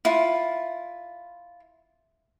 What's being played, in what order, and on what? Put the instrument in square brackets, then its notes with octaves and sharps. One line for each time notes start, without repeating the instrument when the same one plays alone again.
[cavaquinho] E4 F4